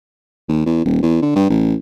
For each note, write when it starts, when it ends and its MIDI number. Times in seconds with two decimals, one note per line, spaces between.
0.48 0.61 39
0.66 0.80 40
0.85 1.02 27
1.03 1.19 40
1.22 1.35 50
1.36 1.48 43
1.50 1.74 33